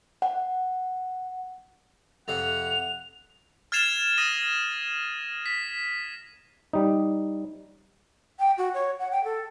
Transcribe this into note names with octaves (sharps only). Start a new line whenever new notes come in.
F#5
F2 C3 C5 F#5 F7
F6 G#6 A6 C7 E7 F7
D#6 A#6 D#7
B6
G3 D#4
G5
F#4
C#5
F#5
G5
A4